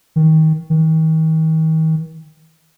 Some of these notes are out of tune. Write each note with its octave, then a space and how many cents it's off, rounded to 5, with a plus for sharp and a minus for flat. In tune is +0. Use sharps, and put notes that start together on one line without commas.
D#3 +25
D#3 +40